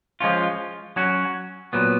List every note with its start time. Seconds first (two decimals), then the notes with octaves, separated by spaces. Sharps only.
0.20 F3 G#3 C#4 F4
0.96 F#3 C#4 F#4
1.73 A#2 F#3 B3